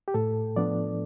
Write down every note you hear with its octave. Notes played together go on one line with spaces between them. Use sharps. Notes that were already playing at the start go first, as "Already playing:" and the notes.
G4
A2 A4
F3 B3 D4 D5